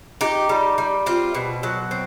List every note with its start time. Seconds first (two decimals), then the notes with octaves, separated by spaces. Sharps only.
0.21 D#4 G4
0.49 G3
0.78 G3
1.06 C4 F4
1.34 B2
1.63 F#3
1.91 C4